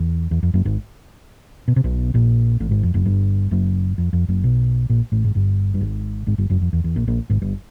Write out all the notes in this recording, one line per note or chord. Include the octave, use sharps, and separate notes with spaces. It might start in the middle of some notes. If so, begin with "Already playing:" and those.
Already playing: E2
E2
F2
F#1 F#2
G#1 G#2
B2
C3
B1 B2
A#1 A#2
A1 A2
G#1 G#2
F2
F#1 F#2
G1 G2
F#1 F#2
F2
F2
F#1 F#2
B1 B2
A#1 A#2
A1 A2
G#1 G#2
G1 G2
G2
G#1 G#2
G#1 G#2
G1 G2
F#1 F#2
F2
E2
E2
A#1 A#2
A#1 A#2
G#1 G#2
G1 G2